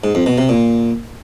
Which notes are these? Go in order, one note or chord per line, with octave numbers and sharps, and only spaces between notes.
G#2
F2
B2
C3
A#2